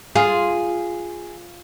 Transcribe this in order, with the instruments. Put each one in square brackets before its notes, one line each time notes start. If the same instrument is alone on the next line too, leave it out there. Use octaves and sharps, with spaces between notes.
[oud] F4 [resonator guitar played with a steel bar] G#4